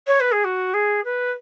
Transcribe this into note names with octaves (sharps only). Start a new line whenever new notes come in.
C#5
B4
G#4
F#4
G#4
B4